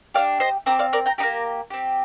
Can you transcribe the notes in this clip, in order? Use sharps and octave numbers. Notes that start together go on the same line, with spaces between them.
D4 G4 D5 F5
C5 D#5
C4 G4 A#5 D6
D5 F5
A#4 D5
G5 A#5
A#3 D#4 G4 A#5 D6
C4 G4